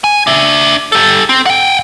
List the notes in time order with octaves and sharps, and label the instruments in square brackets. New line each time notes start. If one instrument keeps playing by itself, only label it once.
[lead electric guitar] G#5
D4 E5
G4 A4
C4
F#5 G5